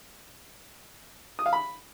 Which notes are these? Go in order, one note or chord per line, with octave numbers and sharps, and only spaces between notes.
D#6
F5
B5